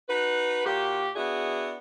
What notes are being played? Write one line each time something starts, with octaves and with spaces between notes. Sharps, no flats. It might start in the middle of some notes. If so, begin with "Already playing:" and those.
D#4 F#4 B4
A#2 A#3 F#4 G4
B3 D4 E4 F#4 G#4